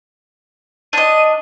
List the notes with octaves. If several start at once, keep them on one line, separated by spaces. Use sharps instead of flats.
D4 D#5 D#7